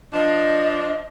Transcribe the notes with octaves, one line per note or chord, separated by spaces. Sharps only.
F3 D4 D#5